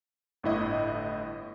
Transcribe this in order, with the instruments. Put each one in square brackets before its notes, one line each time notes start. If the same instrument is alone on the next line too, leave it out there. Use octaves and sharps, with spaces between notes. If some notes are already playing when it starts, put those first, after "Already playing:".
[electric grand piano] G1 A2 E4 D#5